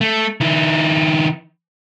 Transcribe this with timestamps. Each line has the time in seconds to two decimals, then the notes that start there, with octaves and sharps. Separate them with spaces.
0.01 A3
0.41 D#3 E4